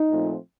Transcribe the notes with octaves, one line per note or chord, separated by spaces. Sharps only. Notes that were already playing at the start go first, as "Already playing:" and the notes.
Already playing: D#4
A#2 F3 A3 C4